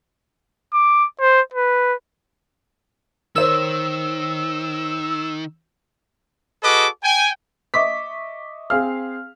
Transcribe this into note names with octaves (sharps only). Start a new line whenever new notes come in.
D6
C5
B4
D#3 A#4 C5 C#5 E6
F#4 G#4 A4 B4 D#5 D6
G5 G#5
D#5 E5 C#6 D6 B6
C4 G#4 F5 F6